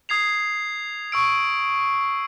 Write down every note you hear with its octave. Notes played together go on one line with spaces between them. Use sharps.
D#6 G#6 C7 F7
C#6 E6 D7